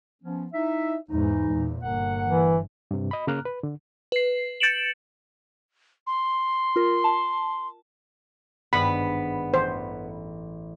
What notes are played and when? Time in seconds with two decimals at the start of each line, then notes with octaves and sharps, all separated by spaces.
0.22 F3 B3 C#4
0.53 D#4 E4 E5
1.10 E2 G#2 E3 G#3 D#4
1.51 E2 A#2
1.82 G1 A#3 A#4 F#5
2.27 E3
2.91 G2 C3
3.11 D#5 B5
3.27 C#3 A#3 A#5 F6 F#6
3.45 B4
3.63 D3
4.12 B4 C7
4.60 G6 A6 C#7 D7 E7 F#7
6.07 C6
6.76 F4 A#4
7.04 A5
8.73 G#1 G2 B3 B5
9.54 A1 C5